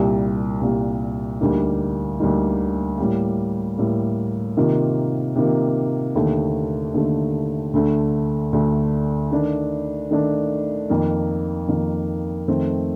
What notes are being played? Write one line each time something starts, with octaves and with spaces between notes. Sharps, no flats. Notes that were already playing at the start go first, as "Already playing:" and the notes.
Already playing: C2 A#2 G3
C2 A#2 G3
D2 D3 G3 A#3 D#4
D2 D3 G3 A#3 D#4
A2 G3 A#3
A2 G3 A#3
C3 D#3 A#3 F4
C3 D#3 A#3 F4
D#2 D3 A3
D#2 D3 A3
D2 D3 A3 D4
D2 D3 A3 D4
D#3 A3 D4
D#3 A3 D4
F2 D#3 A#3
F2 D#3 A#3
F2 D#3 A3 C4